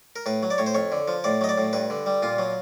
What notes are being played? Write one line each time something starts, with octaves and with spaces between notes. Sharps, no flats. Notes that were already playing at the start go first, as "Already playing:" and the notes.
A#4
A2 B4
F#3
D5
A2 C#5
C5
F2 C#5
D3
F3
A2 D5
F#3 D#5
D5
A2
G2 B4
D3
G3
A#2 F4
F#3